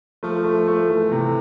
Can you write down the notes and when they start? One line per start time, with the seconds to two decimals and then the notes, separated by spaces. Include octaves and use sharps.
0.23 F3 A3
0.44 A3
0.67 A3
0.89 E3 A3
1.12 C3